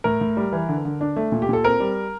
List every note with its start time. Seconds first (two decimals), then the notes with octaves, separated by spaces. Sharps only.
0.04 A2 A#4
0.21 A2
0.37 G3
0.52 E3
0.69 D3
0.85 D3
1.01 D4
1.16 A3
1.32 A#2
1.42 G4
1.49 A#2 A4
1.64 C4 A#4
1.80 G3